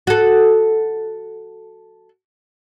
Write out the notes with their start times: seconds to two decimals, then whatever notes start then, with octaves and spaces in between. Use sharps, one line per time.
0.07 F#4 A4